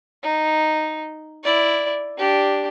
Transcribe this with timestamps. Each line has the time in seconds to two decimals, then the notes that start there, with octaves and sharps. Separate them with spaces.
0.23 D#4
1.44 E4 D5
2.17 D4 G4